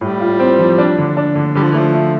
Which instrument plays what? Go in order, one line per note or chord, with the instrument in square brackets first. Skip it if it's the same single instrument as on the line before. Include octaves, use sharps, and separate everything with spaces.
[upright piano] A2 [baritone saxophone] G3
[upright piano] F4
C4
F3
D4
D3
D4
D3
[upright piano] D3 [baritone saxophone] G3
[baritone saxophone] F3
E3
[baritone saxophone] F3 [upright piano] A3
[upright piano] A3